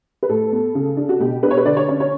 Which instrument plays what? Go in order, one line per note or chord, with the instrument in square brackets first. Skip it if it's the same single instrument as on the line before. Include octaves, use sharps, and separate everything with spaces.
[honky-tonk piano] B4
A2 A4
B3
C#3
D4
F#4
B2 G4
D4 B4
C#5
B4
D3 D5
C#5
C#4 C#5
C#5